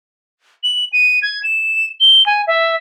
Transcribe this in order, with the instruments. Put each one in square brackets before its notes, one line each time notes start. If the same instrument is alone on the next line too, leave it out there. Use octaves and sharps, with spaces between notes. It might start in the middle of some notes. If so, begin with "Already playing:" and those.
[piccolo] F#7
D#7
G#6
E7
G7
G#5
E5